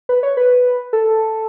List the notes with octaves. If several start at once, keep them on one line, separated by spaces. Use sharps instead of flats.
B4
C#5
B4
A4